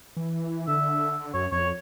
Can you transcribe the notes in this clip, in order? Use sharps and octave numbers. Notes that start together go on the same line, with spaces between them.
E3
D3 E5
F#2 C#5
F2 C#5